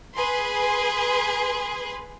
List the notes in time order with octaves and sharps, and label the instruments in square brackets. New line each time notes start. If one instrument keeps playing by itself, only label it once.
[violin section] G#4 B4 C6